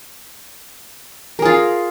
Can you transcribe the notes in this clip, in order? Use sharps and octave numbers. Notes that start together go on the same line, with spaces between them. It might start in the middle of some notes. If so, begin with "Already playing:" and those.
F4 G#4 A#4